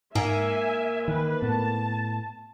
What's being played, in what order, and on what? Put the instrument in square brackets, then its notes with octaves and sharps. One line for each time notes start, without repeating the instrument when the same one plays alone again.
[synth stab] G#2 [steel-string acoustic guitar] A#3 [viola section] E5 G#5
[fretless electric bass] D#3 [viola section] B4
[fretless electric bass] A2 B3 [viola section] A5